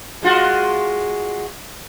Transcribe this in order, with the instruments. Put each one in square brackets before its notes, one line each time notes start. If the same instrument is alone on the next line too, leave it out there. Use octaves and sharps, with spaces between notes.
[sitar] G#3 F4 F#4